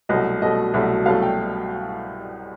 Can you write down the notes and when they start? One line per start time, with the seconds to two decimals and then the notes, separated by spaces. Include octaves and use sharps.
0.09 C2 B2 F#3 A3 D#5
0.42 C2 B2 F#3 A3 D#5
0.74 C2 B2 F#3 A3 E5
1.06 C2 B2 F#3 A3 F5
1.22 G5